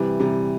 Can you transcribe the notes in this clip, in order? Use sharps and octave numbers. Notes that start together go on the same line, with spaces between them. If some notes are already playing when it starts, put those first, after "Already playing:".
Already playing: C3 E3 G3
C3 E3 G3